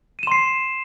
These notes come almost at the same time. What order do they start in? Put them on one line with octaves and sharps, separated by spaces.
D#7 E7 C6 C7